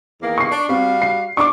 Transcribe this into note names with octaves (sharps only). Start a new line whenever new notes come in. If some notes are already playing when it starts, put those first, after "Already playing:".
E2 D#3 A#3
C#6 C7
D4
G3 C4 F#4 F5
C7
D4 C#6 D6